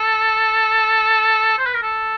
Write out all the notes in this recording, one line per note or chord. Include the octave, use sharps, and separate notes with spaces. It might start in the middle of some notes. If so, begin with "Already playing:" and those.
Already playing: A4
C5
B4
A#4
A4